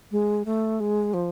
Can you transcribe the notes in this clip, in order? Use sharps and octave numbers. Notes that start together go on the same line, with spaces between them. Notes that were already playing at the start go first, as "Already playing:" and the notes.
G#3
A3
G#3
F3